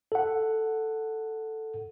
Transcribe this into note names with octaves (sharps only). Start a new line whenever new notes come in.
A4 F#5